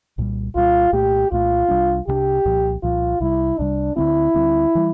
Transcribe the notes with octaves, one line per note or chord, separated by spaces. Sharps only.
C2 A#2 G3
C2 A#2 G3 F4
C2 A#2 A3 G4
C2 A#2 A3 F4
C2 C3 G3 D4
C2 C3 G3 D4 G4
C2 A#2 F3
C2 A#2 F3 F4
C2 C3 G3 E4
C2 C3 G3 D4
D2 D3 G3 C4 E4
D2 D3 G3 C4
E3 G3